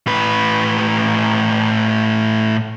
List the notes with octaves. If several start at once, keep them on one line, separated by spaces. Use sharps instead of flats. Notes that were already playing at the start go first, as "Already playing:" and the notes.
A2 B4